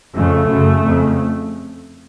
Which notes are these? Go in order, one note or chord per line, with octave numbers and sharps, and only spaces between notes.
F2 C#3 A3
F#2 C#3
F2 C#3